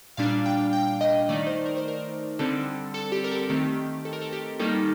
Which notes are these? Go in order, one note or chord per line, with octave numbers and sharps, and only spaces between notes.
A#2 G3 D4 F5
G5
G5
D#5
D#3 A3 D#4 D5
C5
A#4
C5
A#4
D3 G3 C4 A4
A4
G4
A#4
A4
D#3 A3 C4 G4
A4
A#4
A4
G4
D#3 G3 A#3 D#4 A4